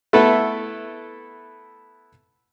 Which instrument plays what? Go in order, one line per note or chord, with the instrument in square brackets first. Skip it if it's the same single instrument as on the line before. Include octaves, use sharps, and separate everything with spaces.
[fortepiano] A3 B3 E4 A4 B4